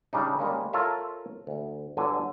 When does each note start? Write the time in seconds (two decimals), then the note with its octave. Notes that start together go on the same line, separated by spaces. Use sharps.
0.13 C#3 G3 D4 D#4
0.39 G3 G#3 A#3 C#4
0.73 F4 A4 A#4 C#5 E5 F5
1.47 D2
1.97 G1 D3 F#3 G#5